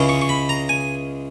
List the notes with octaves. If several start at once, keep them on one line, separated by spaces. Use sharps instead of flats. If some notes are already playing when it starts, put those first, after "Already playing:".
Already playing: C#2 C#3 G#3 C#4 E4
C#6
C#6
B5
A#5
G#5